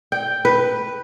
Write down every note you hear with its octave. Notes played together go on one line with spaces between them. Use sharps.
G5
B4